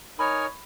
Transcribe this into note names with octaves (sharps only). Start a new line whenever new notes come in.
D#4 A#4 C#5 G#5 B5